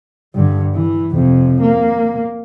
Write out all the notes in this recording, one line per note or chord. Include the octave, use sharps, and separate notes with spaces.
G2 D3
E3
F2 C3
A#3